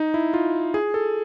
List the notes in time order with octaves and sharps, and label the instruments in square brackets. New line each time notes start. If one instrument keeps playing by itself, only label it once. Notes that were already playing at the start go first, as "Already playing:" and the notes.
Already playing: [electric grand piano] D#4
E4
F4
G#4
A4